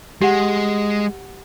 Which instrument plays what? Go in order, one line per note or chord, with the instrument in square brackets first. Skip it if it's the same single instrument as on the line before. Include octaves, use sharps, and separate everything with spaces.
[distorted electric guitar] G#3 [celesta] G4 F#5